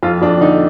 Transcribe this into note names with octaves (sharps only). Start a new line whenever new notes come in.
F2 F4
F2 D4
D3 D#4